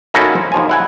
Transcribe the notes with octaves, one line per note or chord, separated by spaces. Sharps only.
A#3 C#4 D#4 E4 F#4 A4
C5
D#2 F3 G#5
E4 F#5 G#5